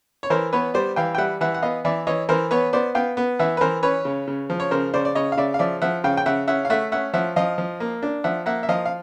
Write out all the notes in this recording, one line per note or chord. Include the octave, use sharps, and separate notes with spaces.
C#5
E3 A#4 C5
B3 B4 C#5
G3 C5 D5
E3 F5 G5
G5
G3 E5 F#5
E3 E5 F#5
F#5
B3 D#5 F5
E3 D5 E5
E3 C#5 D#5
E3 A#4 C5
B3 B4 C#5
B3 C5 D5
B3 F5 G5
B3
E3 E5 F#5
B4
E3 A#4 C5
C#4 B4 C#5
C#3
C#3
F3
C#5
C#3 A#4 C5
C#3 C5 D5
D5
C#3 C#5 D#5
F5
C#3 D5 E5
F5
F3 D5 E5
F3 E5 F#5
C#3 F5 G5
G5
C#3 E5 F#5
C#4 E5 F#5
F5
A3 E5 F#5
C#4 E5 F#5
F3 E5 F#5
F3 D#5 F5
F3
A#3
D4
F3 E5 F#5
A#3 E5 F#5
E5
F3 D#5 F5
F5